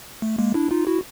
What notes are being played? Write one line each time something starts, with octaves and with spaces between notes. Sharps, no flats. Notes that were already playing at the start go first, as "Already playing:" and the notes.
A3
G#3 A#3
D4 E4
D#4 F4
E4 F#4